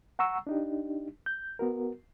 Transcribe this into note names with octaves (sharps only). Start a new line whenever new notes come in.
F#5 A#5 C#6 E6
D4 D#4 G4
G6
B3 F#4 A#4